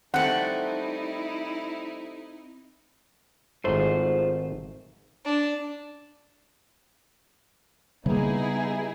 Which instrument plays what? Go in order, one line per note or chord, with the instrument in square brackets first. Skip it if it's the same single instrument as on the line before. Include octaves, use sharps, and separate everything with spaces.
[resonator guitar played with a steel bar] G3 A3 [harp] C4 [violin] D#4 E4 [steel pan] F#5
[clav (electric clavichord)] G#1 G#2 A3 [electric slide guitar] F4 C5
[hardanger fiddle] D4
[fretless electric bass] C#3 A#3 [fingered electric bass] G3 [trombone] B3 [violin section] D#4 E4 G#4